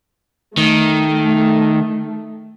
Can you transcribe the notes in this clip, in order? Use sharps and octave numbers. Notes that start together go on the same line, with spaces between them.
D#3 A3